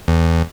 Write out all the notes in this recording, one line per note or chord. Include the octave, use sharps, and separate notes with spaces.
E2